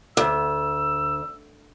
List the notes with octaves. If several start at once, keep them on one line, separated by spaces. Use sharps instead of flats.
D2 E6